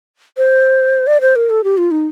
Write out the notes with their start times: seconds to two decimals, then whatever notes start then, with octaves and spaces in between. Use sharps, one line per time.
0.37 C5
1.07 D5
1.21 C5
1.36 A#4
1.50 A4
1.64 G4
1.78 F4
1.91 D#4